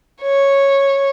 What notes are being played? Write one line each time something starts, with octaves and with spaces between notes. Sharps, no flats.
C#5